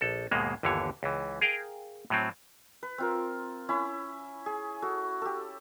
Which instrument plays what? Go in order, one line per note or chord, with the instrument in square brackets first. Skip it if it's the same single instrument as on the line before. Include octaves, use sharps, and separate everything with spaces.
[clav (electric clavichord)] A#1 A4
D#2 G#2 B2 G#3 A#3
G1 D#2 D3 E3 C#5
C#2 E3
G#4 A#4 F5 G5
A2 F#3 C4
[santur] B4
C4 F4 A#4
C#4 E4 B5
G#4
F#4 A4
G4 A4